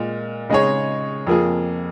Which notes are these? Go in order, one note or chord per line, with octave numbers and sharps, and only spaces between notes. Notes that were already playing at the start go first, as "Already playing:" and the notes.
Already playing: A#2 G#3 F4
C#3 G#3 D#4 G#4 C#5
F2 F3 A#3 F4 G#4